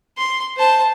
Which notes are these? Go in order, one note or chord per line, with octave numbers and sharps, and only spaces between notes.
C6
C5 A5